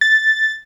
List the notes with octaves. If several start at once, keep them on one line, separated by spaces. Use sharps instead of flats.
A6